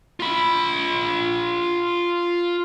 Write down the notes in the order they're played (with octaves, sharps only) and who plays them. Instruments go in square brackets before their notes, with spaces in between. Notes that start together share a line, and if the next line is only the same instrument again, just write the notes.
[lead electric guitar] F4 B5